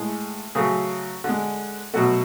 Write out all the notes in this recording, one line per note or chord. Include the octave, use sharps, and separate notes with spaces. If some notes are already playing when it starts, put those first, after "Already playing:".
Already playing: A2 G#3
C#3 F#3 A3 G#4
D3 G#3
B2 F#3 A3 F#4